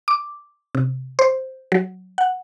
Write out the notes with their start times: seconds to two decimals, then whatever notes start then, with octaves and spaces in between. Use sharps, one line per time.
0.08 D6
0.75 C3
1.19 C5
1.72 F#3
2.18 F#5